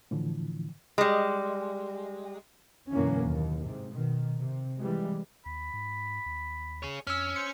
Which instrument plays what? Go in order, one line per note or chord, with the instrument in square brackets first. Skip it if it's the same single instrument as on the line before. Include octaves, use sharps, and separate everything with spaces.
[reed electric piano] A2 D3 E3 F3
[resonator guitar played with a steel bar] G3 G#3
[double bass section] F#2 B2 D3 E3 A#3 C#4
D#2
G#2 C3
B2 D#3
C3
E3 G3 G#3
[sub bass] D#2 [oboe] B5
[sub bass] G#2
D#2
[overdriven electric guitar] G#4 C#5
[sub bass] F2 [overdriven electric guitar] C#4 [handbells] E6 F6
[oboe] C5 [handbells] C#7